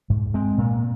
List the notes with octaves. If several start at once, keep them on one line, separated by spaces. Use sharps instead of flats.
G#2
G#3 C4
A#2